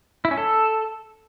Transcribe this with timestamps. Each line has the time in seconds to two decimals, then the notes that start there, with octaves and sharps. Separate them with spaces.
0.25 E4
0.31 C#4
0.37 A4